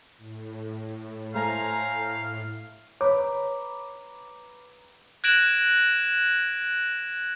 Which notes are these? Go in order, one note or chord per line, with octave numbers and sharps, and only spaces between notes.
A2
A3 C5 F5 G#5 A#5
B4 C#5 A#5 B5 D6
F#6 G#6 A#6 D7 E7 F#7